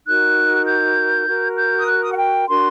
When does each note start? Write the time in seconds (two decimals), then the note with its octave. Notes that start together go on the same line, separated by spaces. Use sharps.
0.06 D#4 F#4 A#4 F#6
0.66 G6
1.27 F#4 A#4
1.57 G6
1.78 D#6
1.87 F#6
2.02 D#6
2.12 F#5
2.17 G5
2.48 D4 F#4 A#4 C6